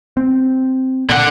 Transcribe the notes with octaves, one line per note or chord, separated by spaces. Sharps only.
C4
A#2 D3 F#5